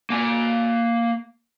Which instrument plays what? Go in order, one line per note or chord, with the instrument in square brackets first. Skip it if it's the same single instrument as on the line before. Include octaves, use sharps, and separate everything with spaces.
[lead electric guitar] A#3 G#5